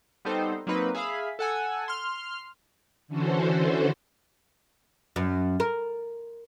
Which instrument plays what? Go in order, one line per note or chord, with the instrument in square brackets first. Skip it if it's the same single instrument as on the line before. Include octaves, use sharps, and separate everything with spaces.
[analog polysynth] G3 B3 C4 D#4 A4 C5
F#3 A#3 C4 D#4 B4
G#4 E5 F5 B5
A4 F#5 G#5 E6
C6 F6
[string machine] D3 E3 C#4 F#4 A4 C5
[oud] F#2
A#4